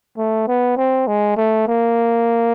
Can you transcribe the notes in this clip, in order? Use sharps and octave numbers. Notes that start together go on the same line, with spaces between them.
A3
B3
C4
G#3
A3
A#3